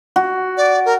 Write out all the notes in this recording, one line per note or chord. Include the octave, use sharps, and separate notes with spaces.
F#4
D5
A#4